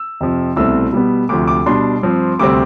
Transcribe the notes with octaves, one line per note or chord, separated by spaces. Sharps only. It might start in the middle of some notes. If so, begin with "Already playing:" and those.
Already playing: E6
F2 C3 F3
C2 B2 A3 C4 E6
B2 G3 B3
D2 C3 F3 D6
D6
B2 G3 D4 C6
G2 F3 C4
D2 C3 G3 C4 D6